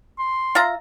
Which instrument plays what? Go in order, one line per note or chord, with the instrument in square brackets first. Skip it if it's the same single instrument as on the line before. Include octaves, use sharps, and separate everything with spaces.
[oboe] C6
[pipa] F4 E5 A#5